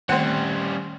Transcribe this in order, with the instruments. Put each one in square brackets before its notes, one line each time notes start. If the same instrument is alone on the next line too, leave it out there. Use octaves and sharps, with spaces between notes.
[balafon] D#3 A3 [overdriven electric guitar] G3 C#4 [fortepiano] C4 F#5